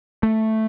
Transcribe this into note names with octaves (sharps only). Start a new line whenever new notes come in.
A3